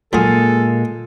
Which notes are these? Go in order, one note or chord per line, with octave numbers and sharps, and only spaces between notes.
A#2 F#3 G#3 A#3 F4 G#4 A4 G#5